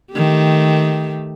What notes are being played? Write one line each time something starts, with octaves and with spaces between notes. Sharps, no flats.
D#3 A3 G4